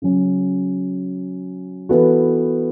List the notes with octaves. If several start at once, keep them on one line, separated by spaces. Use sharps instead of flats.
C#3 F#3 C#4
E3 B3 F#4 A4